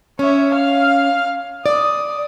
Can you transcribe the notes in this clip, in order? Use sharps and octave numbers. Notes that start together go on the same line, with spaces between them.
C#4 C#5 E5
F5 F6
D5 D#6